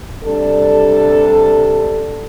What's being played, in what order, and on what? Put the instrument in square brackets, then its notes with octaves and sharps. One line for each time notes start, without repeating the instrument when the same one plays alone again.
[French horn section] C3 G3 D4 A4